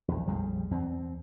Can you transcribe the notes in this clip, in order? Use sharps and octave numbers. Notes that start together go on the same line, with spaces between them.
A#1 E2
A#1 F2 G3 G#3
E2 C4